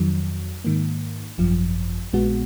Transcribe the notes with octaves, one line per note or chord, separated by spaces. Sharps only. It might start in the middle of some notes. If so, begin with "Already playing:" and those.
Already playing: F2 D#3 F#3
G#2 D#3 A#3
G#1 F#2 F3
A#1 A#2 G#3 B3 F#4